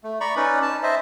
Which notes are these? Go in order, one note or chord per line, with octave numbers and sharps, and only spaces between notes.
A3
D5 A#5 B5 C#6
C#4 D#4 B4 D5
A5
C5 D#5 E5